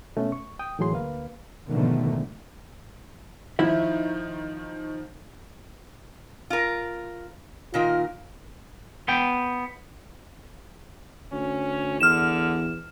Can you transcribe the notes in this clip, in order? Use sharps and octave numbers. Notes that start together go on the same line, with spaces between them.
B2 A3 B3 C#4
C#6
G5 D#6
A2 E3 F#3 G#4 C6
D2 A#3 B4 F5
G#2 B2 D3 D#3 F3 A3
D#3 F3 E4 E5
F4 A#4
A#2 D#3 F4 A#4
B3 G5
D2 C#4
E2 D3 F6 E7